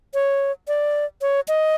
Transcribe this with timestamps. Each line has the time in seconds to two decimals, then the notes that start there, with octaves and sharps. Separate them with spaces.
0.14 C#5
0.68 D5
1.22 C#5
1.48 D#5